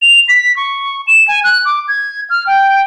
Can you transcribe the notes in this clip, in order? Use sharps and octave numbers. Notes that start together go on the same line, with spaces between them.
F7
B6
C#6
E7
G#5
F#6
D6
G#6
F6
G5